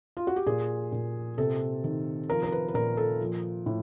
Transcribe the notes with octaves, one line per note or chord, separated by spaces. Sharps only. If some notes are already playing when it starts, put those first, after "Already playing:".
F4
F#4
G4
A#2 G#4
A#2
C3 A4
D#3
F3 A#4
A#4
B4
B4
A#2 A#4
A4
F3
A2